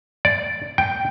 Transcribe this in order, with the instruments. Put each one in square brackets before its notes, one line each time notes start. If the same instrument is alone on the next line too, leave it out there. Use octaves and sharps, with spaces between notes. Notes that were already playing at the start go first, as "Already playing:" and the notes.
[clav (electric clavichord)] D5
G5